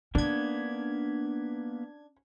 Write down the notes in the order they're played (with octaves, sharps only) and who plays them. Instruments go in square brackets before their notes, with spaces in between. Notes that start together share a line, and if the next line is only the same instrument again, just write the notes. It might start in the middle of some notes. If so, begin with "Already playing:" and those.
[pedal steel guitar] A#3 B3 [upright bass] C#4 [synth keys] D4 G#6